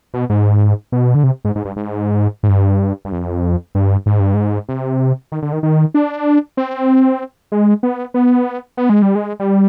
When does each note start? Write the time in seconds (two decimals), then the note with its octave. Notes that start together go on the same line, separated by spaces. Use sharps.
0.14 B2
0.30 G#2
0.92 B2
1.15 D3
1.24 C3
1.45 G#2
1.55 G#2
1.65 G2
1.76 G#2
2.43 G#2
2.49 G2
3.05 G2
3.12 F2
3.75 G2
4.06 G#2
4.20 G2
4.34 G#2
4.69 C3
5.32 D#3
5.42 D3
5.53 D#3
5.63 D#3
5.94 D4
6.57 C4
7.52 G#3
7.83 B3
8.14 B3
8.77 B3
8.90 G#3
9.02 G3
9.15 G#3
9.40 G3